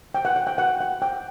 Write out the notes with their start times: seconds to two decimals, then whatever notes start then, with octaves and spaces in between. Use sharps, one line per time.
0.14 G5
0.25 F#5
0.36 F#5
0.47 G5
0.58 F#5
0.80 F#5
1.02 G5